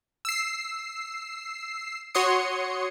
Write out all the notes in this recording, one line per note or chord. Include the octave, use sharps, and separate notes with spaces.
E6 C7
F#4 C#5 C6 D#6 C#7